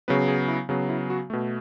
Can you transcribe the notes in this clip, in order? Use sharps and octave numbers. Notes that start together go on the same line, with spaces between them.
C#3 F#3 B3 B4
G#4
E4
C#3 F#3 B3
E4
F#4
B2 A3